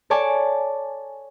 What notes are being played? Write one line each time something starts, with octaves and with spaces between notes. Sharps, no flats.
A4 C#5 D5 G#5 A5